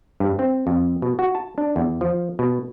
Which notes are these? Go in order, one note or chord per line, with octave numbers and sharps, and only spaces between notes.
G2
C4
F2
B2
F#4
A5
D4
E2
F3
B2